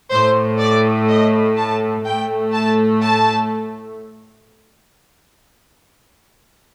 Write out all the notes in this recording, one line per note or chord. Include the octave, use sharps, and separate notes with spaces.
A2 A3 C5
D5
D#5
A5
A2 A3 G5
A5
A5